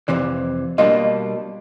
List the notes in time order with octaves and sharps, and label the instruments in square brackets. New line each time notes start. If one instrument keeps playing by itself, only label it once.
[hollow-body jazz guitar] F2 C3 E3 [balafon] D5
[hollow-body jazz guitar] B2 G3 A#3 D4 F4 [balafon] D#5